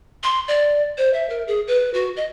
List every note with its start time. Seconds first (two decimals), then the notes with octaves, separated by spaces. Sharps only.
0.23 C6
0.48 D5
0.98 C5
1.13 E5
1.30 A#4
1.48 G#4
1.67 B4
1.94 F#4
2.17 D#5